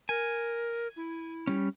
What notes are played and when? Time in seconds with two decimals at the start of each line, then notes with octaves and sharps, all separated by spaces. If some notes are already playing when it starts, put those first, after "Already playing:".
0.09 A#4 G#5
0.96 E4
1.47 G3 C#4